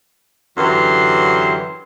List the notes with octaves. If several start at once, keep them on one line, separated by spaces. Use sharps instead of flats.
F#2 D3 E3 G4 C6